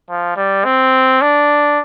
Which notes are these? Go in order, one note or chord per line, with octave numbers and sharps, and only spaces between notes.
F3
G3
C4
D4